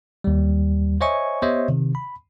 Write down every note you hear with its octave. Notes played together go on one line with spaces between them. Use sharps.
D#2 G3
C5 C#5 D#5 E5 G#5 C#6
B3 G4 C5 C#5 D#5 E5
C3 D#3
B5